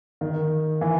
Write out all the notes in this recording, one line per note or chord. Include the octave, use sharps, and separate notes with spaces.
D#3
E3